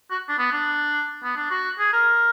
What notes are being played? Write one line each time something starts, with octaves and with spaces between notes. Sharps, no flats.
F#4
D4
B3
D4
B3
D4
F#4
G#4
A#4